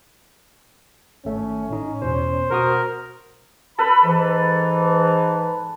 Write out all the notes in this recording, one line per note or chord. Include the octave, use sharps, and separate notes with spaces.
G#1 A3 C#4
A2 D#4
E2 B2 C5
B2 F#4 A#4 D#6
A4 B4 B5
G#2 E3